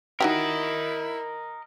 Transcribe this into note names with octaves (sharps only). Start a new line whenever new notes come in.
D#4 E4 F#4 G4 A#4 D#5